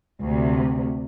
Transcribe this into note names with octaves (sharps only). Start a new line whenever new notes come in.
D2 C3